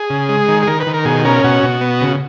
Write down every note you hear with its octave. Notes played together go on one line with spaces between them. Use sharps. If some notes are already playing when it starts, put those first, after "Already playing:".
Already playing: G#4
C#3
G#3
D#3
G#4
D#3 A#4
B4
D#3
A#4
B2 G#4
C#4 A#4
B2 F#4
B2
B3
C#3